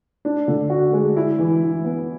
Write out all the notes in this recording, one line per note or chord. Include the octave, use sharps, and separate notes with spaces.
D4
D3
F#4
G#3
E4
E3
E3
B3